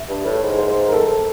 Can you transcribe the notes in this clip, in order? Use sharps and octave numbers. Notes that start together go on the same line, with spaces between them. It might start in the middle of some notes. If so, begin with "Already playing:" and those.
Already playing: E5
G2
A2
G#2
C5
A#4
A4